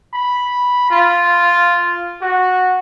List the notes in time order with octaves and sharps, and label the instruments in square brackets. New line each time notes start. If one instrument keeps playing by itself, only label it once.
[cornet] B5
F4
F#4